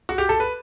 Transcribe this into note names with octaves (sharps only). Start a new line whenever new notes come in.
F#4
G4
A4
B4